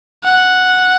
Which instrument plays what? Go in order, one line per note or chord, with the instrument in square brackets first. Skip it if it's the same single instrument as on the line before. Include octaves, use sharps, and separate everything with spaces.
[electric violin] F#5